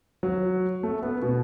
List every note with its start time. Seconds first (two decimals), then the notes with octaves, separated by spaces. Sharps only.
0.23 F#3
0.83 A3
1.03 B3
1.22 B2